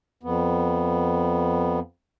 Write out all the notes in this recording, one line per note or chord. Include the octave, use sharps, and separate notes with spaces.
F2 B3